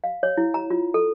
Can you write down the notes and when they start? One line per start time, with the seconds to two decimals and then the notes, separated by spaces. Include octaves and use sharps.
0.04 F5
0.23 C#5
0.37 E4
0.54 A#5
0.70 F4
0.94 A4